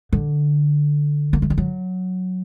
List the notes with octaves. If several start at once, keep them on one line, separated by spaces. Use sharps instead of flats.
D3
A#3
A3
G3
F#3